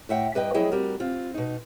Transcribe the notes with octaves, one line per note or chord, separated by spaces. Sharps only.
A2 E5 F#5 G5
G2 B4 D#5 G5
F2 F#3 E4 G#4 D#5 G5
G3 C4 F#4 A#4
C4 F4
B2 D#4